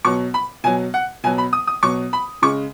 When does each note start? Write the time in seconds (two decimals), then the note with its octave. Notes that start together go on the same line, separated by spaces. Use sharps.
0.05 B2 F#3 C#6
0.34 B5
0.64 B2 F#3 G#5
0.94 F#5
1.24 B2 F#3 G#5
1.38 B5
1.53 D#6
1.67 D#6
1.83 B2 F#3 C#6
2.13 B5
2.42 C#3 G#3 C#6